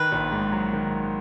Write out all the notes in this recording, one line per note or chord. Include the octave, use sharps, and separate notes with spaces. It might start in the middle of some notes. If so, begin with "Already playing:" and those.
Already playing: D#3 B4
A#1
G#2
F#3
D#3